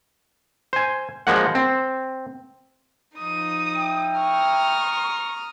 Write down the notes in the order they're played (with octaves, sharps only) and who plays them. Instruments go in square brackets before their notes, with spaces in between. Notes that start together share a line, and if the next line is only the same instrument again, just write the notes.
[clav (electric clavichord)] C5 G#5
F3 G#3 A#3 F#5
C4
[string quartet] F3 D#4 [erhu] D#6
[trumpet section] E4 G5
[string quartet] A#5 D#6 F6 [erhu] C#6